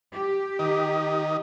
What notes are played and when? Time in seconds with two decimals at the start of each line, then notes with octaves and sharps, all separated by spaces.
0.11 G4
0.59 D#3 D#5